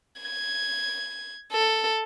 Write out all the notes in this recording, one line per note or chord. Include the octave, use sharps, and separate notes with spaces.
G#6
A4